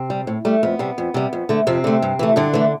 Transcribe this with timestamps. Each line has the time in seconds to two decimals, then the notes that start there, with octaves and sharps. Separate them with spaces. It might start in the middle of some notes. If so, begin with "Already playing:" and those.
Already playing: C3 C4
0.10 G3
0.27 A2
0.45 G3 A3
0.63 F2 B3
0.79 C3 G3
0.98 F2
1.14 C3 G3
1.33 F2
1.49 D3 A3
1.67 F2 C3 C4
1.84 D3 A3
2.02 G2
2.19 E3 A3
2.36 G2 D3 D4
2.53 E3 A3